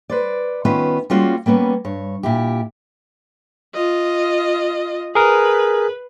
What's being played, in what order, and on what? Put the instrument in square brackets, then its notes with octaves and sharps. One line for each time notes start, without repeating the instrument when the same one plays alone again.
[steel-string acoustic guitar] B4 C5 D5
D#3 B3 C#4 F4 B4
G3 G#3 A#3 C#4 F4 F#4
G3 A#3 B3 C#4
G2 C#5
A#2 E4 G4
[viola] F4 D#5
[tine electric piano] G#4 A#4 [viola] B4